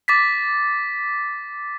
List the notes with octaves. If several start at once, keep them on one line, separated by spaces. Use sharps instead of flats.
D6 A6 B6